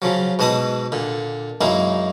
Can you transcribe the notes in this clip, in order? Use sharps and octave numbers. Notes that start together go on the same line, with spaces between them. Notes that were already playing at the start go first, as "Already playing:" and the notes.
C#3 F3 F#3
G#2 B2 D#5 A5 B5 D#6
A#2 D3
F#2 G#3 A#3 D#4 E4